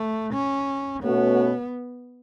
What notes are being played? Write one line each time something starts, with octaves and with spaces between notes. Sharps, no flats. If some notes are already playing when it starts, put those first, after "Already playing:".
Already playing: A3
C#4
B2 A3 B3 C#4 F#4 C#5